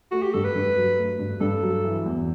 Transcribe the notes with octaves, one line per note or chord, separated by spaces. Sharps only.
A3 F#4
G4
G2 A4
B4
G2
F#3
A3
G2
G2 A4
F#3
E3
E2